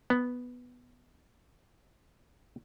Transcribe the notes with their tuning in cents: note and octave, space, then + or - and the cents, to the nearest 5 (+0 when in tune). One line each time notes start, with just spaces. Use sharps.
B3 +0